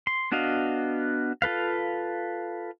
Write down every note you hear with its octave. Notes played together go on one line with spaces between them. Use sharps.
C6
B3 D4 F#4 D#5 F5
F4 A4 B4 F5